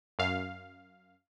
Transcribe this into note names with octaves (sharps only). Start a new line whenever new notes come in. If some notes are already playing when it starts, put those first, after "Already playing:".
F#2 F5